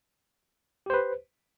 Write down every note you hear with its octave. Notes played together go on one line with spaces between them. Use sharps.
G4 B4 C5